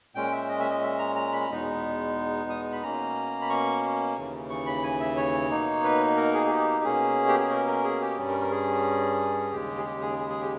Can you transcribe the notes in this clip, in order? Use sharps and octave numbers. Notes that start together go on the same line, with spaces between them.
A#2 G#3 C#4 G5
E5
D#5
E5
D#5
E5
A#5
A#5
B5
E2 B2 G#3 B3 D#4
D#6
B5
B2 A#3 C#4 A#5
B5
C#6
D#2 C#3 E3
C#6
B5
G#5
E5
C#5
B2 A#3 D#4
B4
A#4
G#4
G#4
G4
B2 A#3 C#4 G#4
G4
G#4
A#4
A#4
G#4
G4
G2 G3 C#4
A#4
A#4
G#4
D#2 C#3 G#3 G4
G#4
G4
G#4
G#4
G#4
G4